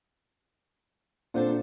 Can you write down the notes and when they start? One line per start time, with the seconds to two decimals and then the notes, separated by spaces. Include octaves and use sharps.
1.34 A#2 C4 D4 A4 C5 F#5